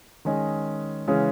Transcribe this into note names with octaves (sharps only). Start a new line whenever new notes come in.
D#3 G#3 C#4 G#4 D#5
C#3 E3 G#3 C#4 G#4